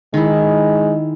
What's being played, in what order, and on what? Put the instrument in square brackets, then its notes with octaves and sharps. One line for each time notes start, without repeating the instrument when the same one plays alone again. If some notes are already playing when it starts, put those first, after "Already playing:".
[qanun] D#3 E4 [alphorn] G#3